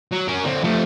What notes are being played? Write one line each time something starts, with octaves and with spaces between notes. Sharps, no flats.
F#3
C#4 A#4
D3 C4
F3 A3